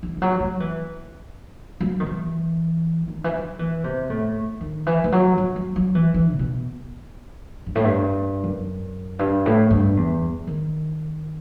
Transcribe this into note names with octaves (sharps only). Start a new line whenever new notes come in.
E3
E3
F#3
F#3
E3
F#3
D#3
E3
D#3
E3
F#3
E3
C3
A2
D#3
E3
E3
F#3
F#3
F#3
F#3
E3
E3
A2
B2
G2
A2
G2
F#2
G2
A2
G2
E2
D#3